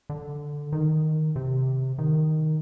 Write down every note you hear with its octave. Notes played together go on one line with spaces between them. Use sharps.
D3
D#3
C3
D#3